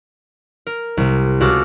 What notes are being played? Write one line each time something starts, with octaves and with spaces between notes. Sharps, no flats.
A#4
C2 C3
C#2 F#4 A4 D6 F6